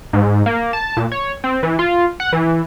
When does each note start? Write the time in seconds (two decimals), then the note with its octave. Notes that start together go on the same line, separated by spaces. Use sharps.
0.13 G#2
0.46 A#3
0.73 A5
0.97 A#2
1.12 C#5
1.44 C4
1.63 E3
1.79 F4
2.20 F#5
2.32 E3